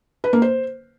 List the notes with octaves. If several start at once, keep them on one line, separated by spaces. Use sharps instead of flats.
B4
A#3
C5